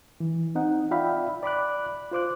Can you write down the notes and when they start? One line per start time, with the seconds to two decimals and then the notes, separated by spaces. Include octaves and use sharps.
0.20 E3
0.55 C4 D#4 F#5
0.91 F4 D5 E5 F5 G5 B5
1.43 D5 B5 D6 F#6
2.12 F4 C5 D6 F#6